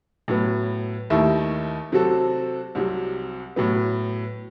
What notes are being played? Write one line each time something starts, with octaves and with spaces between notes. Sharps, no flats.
A2 F#3 B3
D#2 D#3 A3 E4
C3 F#3 C4 F#4 A4
C2 C3 F#3
A2 F#3 B3